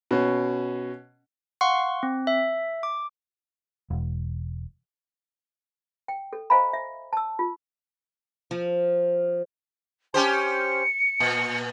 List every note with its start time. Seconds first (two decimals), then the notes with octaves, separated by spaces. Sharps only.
0.11 B2 C#4
1.61 F5 F#5 C6 C#6
2.03 C4
2.27 E5
2.83 D6
3.90 E1
6.08 G5
6.33 A4
6.50 C5 D#5 F5 G#5 A#5 B5
6.73 E5
7.13 A5 E6
7.39 F4
8.51 F3
10.14 C#4 G4 C5 A5
10.33 C#7
11.20 A#2